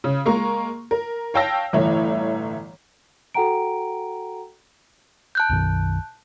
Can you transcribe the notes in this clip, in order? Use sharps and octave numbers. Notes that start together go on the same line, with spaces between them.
C#3
G#3 A#3 A#5 C#6
A#4
C#5 F5 G5 A5 E6 A#6
G1 A2 E3 E4 C#5
F#4 A4 F#5 G5 A#5 D7
A5 F#6 G6
B1 F#2 D#3